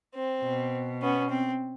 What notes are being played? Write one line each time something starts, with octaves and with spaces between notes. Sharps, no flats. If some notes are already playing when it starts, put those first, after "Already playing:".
C4
B2
B3 C#4
C4